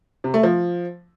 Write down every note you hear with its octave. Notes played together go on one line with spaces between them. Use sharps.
C3
A3
F3